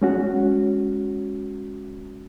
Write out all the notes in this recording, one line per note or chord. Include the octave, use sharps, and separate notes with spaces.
G#3 C#4 F#4